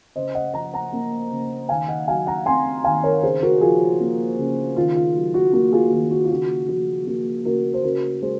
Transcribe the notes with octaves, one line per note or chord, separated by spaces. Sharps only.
C#3 C5 D#5
D#5 F#5
F3 F#5 A#5
F#5 A#5
A#3
C#3
D#3 F5 G#5
D#5 F#5
F#3 F5 G#5
F#5 A#5
C4 G#5 C6
D#3 F5 G#5
A#4 C#5
C#3 G#4 C5
F#4 A#4
F3 F4 G#4
A#3
C#3
D#3 F4
F4
F#3
F#4
A#3 F#4
F4 G#4
D#3 F4
F#4
F4
C#3 F#4
F3 F#4
A#3 F#4
C#3 F#4 A#4
C5
C#3 F#4 A#4
G#3 G#4 C5